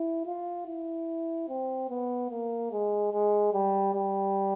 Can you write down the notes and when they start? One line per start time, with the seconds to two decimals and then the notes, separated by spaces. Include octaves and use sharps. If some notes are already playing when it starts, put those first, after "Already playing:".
Already playing: E4
0.26 F4
0.67 E4
1.49 C4
1.89 B3
2.30 A#3
2.71 G#3
3.12 G#3
3.53 G3
3.94 G3